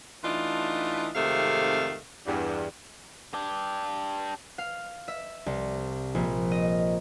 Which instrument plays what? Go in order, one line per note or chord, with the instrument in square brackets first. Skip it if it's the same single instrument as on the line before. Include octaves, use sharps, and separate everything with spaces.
[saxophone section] E3 A3 D4 D#4 F4
F2 G#2 C3 D#3 A3 F5
E2 G2
[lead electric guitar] D4 G4
[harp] F5
E5
C2
A#1
D#5